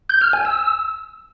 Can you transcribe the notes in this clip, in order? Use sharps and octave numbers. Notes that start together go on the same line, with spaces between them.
G6
F6
G#5
E6